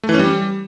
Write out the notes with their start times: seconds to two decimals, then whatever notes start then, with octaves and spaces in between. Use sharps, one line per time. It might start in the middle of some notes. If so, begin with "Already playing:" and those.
0.03 A3
0.09 E3
0.14 C#4
0.19 G3